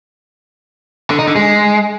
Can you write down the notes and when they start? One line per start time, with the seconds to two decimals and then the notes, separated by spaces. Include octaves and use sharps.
1.10 D3
1.19 D#4
1.27 D3
1.35 G#3